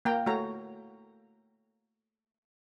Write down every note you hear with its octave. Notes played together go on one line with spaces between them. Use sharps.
A#3 G5 A#5
A3 F#4 C#5 A#5